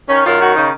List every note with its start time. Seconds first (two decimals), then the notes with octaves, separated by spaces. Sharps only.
0.08 D#3 C#4
0.24 F#2 F4
0.40 D#3 F#4
0.55 C#3 D#4